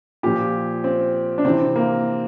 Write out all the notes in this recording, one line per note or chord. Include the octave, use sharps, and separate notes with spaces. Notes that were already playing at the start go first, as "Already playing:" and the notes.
A#2 F3 G4
C4
D4
C3 E3 C4
A#3